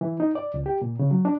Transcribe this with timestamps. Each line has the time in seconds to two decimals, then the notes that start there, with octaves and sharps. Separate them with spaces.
0.01 E3
0.20 D#4
0.35 D5
0.54 C#2
0.66 G4
0.82 A#2
0.99 C#3
1.11 F#3
1.25 D4